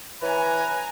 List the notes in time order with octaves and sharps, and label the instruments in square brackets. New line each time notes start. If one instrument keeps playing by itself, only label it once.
[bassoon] E3 [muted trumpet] B4 [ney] C#5 [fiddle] G#5 A#5